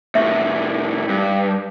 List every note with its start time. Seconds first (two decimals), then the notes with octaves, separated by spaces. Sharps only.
0.15 A2 C3 E5 C#6
1.09 G2